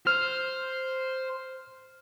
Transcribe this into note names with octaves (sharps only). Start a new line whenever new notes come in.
C5 F6